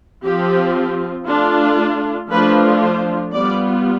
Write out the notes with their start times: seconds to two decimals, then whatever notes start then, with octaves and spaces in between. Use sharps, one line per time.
0.25 F3 C4 F4 G4
1.28 A3 D4 F4
2.31 F3 A3 D4 F4 B4
2.82 C5
3.34 G3 B3 F4 D5